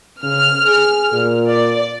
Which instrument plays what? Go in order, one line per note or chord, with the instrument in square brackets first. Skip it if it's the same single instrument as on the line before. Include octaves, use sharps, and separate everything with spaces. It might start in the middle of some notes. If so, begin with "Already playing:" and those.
[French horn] C#3 [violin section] F6
[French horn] G#4
A#2
[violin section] D5